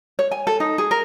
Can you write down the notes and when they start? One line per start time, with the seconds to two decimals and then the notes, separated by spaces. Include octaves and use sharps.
0.19 C#5
0.31 G#5
0.47 A4
0.60 D#4
0.78 G#4
0.91 A#4